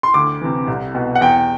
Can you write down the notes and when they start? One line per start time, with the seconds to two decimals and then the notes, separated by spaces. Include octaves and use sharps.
0.03 C6
0.14 D2 D6
0.41 C3 E3
0.68 C2
0.95 B2
1.15 F#5
1.21 E2 G5